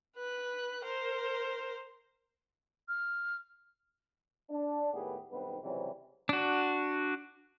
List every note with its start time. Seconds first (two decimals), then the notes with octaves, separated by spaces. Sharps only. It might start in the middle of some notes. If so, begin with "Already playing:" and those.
0.16 B4 F#6
0.84 A#4 C5
2.88 F6
4.50 D4
4.93 D#2 A2 B3 G4 G#4 B4
5.32 B1 G2 D#3 B3 C4 B4
5.63 C#2 C3 E3 F#3 G3 C4
6.29 D4 F#4